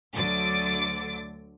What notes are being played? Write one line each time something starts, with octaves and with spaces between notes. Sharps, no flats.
D2 D3 F#3 D6 A6